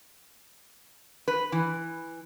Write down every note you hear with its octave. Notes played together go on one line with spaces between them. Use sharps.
B4
E3